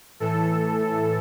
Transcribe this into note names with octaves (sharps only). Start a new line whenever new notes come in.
A2 E3 A4